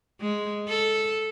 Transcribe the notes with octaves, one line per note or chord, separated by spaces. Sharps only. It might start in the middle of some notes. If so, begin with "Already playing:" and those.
G#3
A4